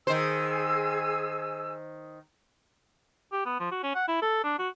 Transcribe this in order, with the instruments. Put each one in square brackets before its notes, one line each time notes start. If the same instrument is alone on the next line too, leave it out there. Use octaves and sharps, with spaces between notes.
[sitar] D#3 C5 [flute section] G#4 G#5 E6
[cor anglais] G4
B3
F3
F#4
C#4
F#5
E4
A4
D4
F#4